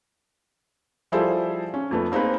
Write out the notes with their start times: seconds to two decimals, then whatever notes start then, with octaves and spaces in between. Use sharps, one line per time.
1.12 F3 G3 E4 G#4 A4 C5
1.74 C#4
1.91 F2 A3 B3
2.12 A#3 C4 D#4 G#4 B4